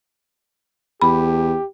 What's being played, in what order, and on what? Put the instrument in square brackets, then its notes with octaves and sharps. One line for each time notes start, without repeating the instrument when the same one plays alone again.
[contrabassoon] E2 [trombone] G4 [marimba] B5